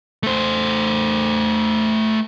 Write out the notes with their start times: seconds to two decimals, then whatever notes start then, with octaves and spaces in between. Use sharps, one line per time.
0.23 A3 C5